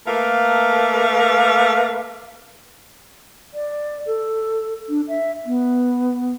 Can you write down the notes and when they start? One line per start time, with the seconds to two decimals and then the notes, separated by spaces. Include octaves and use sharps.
0.06 A3 A#3 A#4 B4 F5
3.54 D5
4.07 A4
4.89 D4
5.08 E5
5.46 B3